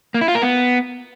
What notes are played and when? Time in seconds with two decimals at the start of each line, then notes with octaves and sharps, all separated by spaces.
0.14 A#3
0.21 E4
0.28 F4
0.35 A#4
0.42 B3